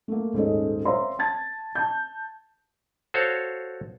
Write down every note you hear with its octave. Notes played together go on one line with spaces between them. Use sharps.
A3 A#3
D#1 G#2 C#4 A4 D#5
C5 C#5 E5 F5 A#5 C6
A5 G#6 A6
A5 G6
F#4 A4 C5 C#5 F5